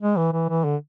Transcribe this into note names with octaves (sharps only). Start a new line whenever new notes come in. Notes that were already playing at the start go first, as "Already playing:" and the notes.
G#3
E3
E3
E3
D3